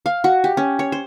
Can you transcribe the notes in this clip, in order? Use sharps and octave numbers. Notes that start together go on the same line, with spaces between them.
F5
F#4
G4
C#4
C#5
C5